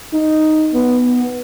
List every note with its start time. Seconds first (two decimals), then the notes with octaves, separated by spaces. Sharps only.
0.13 D#4
0.73 B3